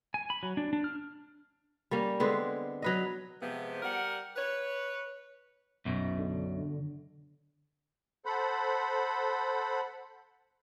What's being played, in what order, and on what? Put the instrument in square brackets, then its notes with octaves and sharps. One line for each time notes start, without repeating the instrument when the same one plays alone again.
[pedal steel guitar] G#5
B5
F#3
D4
D4
F6
[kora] G3 A#3 C#4
D3 G#3 B3 C4
F#3 B4 D#5
[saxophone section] C3 F3 G#3 B3
G3 A#4 F#5
B4 C#5
[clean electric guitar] B1 F#2 B2
[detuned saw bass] D3
[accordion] A4 C5 F#5 B5